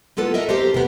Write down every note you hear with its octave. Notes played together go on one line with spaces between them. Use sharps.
A#3 B3 F4 A4 B4
A#4 D#5 E5
C4 G4 A4 A#4 C5
C3 A#3 B3